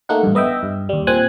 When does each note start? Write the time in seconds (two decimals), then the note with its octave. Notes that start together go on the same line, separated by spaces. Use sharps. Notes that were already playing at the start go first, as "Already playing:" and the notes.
0.09 A3 A#3 D#4 F#5
0.23 A1 G2
0.35 B3 D#5 E5 G5
0.63 G2
0.89 D#2 G3
1.07 A#2 C4 G#5 F#6